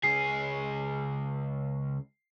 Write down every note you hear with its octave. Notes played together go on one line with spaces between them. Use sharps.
C#2 G#4 C7